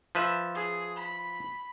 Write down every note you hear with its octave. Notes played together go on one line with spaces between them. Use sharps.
F3 B4 E5
G#4
B5